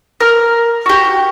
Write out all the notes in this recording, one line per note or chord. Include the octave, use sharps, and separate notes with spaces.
A#4 F6
F#4 G4